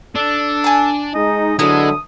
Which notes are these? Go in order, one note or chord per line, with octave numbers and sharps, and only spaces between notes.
D4 A4
G#5 A5
G#3 D#4 D#5
D3 F#3 G#3 B3 E4 A4 D#6